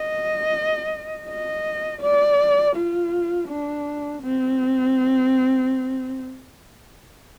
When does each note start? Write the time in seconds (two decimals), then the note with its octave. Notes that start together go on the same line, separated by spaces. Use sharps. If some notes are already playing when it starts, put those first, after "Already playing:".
Already playing: D#5
1.28 D#5
2.02 D5
2.76 F4
3.48 D4
4.22 C4